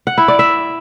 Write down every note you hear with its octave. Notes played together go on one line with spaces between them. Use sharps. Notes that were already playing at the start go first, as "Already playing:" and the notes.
F#5
E4
D5
E5